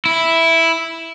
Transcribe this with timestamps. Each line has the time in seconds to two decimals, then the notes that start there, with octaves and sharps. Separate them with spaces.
0.05 E4